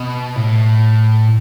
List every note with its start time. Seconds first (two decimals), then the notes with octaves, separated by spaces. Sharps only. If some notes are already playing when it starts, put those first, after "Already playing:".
Already playing: B2
0.36 A2